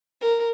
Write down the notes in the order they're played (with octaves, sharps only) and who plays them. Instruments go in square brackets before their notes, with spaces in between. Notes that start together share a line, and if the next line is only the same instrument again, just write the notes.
[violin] A#4